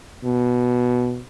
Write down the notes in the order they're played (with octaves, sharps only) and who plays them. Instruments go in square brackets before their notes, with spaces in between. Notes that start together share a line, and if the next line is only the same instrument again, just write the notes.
[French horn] B2